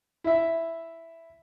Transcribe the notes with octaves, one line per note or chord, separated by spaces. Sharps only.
E4 E5